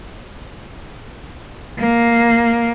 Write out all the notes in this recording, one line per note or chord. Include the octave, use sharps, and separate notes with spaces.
A#3